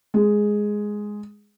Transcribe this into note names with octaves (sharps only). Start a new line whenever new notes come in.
G#3